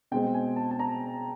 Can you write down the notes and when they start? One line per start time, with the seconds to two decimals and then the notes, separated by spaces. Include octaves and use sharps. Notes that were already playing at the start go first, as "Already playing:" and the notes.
0.11 B2 G#3 C4 G5
0.34 G#5
0.56 A5
0.71 A5
0.79 A#5